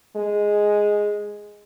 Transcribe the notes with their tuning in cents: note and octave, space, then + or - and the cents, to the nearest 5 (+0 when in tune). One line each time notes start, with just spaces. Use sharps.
G#3 +0